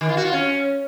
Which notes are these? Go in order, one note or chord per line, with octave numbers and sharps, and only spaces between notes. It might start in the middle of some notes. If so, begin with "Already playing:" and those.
D#3
F4
F#4
F4
C#4